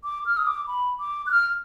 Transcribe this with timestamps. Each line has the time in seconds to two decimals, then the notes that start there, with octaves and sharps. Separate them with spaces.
0.04 D6
0.26 F6
0.37 D#6
0.47 D6
0.67 B5
1.00 D6
1.26 F#6
1.31 F6